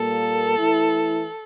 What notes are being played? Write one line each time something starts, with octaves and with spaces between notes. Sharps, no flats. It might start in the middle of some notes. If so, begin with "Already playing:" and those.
Already playing: A#2 G3 A#3 A4
E3 A3 E4